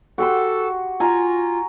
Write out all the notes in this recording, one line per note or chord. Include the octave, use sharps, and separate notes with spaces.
F#4 G4 A4 C6
F4 G#5 A#5